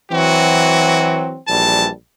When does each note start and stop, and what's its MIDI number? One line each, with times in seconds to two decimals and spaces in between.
0.12 1.39 52
0.12 1.39 54
0.12 1.39 60
0.12 1.39 66
1.48 1.90 34
1.48 1.90 52
1.48 1.90 55
1.48 1.90 81